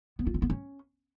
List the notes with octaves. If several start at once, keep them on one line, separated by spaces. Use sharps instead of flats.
B3
F4
C4
B3
C#4